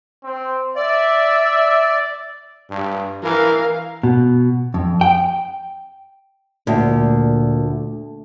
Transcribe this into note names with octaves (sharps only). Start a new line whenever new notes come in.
C4
D5 E5
G2
E3 A#4 F5
B2
F2
G5
D2 A#2